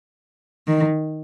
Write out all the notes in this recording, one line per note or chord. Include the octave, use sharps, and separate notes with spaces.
D#3